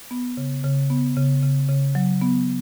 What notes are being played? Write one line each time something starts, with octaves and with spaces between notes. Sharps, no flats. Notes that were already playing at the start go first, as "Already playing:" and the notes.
B3
C#3
C#3
B3
C#3
C#3
C#3
F#3
B3